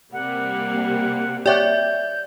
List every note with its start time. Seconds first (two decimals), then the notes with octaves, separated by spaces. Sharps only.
0.12 C3 G3 A#3 F#5
1.46 G4 C#5 D5 E5 F#5 G6